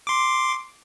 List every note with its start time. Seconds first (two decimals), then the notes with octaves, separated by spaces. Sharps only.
0.07 C6 D6